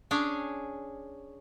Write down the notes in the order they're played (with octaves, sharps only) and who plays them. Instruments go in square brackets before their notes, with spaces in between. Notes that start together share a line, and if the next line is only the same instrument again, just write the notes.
[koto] C#4 D4 G#4 C#5 G#5